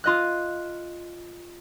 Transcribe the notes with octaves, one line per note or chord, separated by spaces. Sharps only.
F4 D#5 F#6